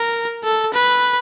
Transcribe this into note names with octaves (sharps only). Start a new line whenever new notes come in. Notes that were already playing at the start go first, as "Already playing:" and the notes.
Already playing: A#4
A4
B4